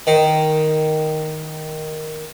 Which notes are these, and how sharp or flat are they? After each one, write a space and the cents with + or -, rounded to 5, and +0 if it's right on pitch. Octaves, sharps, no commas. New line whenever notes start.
D#3 +0